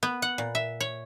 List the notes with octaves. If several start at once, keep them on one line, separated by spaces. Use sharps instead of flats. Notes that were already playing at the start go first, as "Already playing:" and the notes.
B3
F#5
A#2
E5
C#5